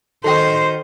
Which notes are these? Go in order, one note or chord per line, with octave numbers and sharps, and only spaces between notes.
D#3 F#4 A4 C5 D#5 G5